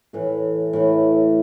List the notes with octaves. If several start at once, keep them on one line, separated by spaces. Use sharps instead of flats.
A2 E3 A3
A2 E3 A3